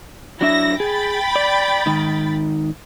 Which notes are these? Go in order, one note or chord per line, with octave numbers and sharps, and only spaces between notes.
F#3 D4 E4 E5 A#6
G#4 G5 B5 A6
D5
G#2 D#3